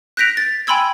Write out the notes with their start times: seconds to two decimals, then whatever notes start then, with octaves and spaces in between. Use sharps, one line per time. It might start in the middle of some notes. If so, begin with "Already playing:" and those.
0.17 F#6 G6 A#6 B6 D7 F7
0.37 A6
0.67 G5 G#5 B5 C6 E6 G#6